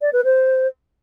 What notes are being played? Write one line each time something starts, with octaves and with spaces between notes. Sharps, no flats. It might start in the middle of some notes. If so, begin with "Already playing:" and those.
D5
B4
C5